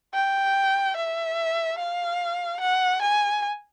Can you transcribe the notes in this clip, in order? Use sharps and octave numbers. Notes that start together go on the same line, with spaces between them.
G5
E5
F5
F#5
G#5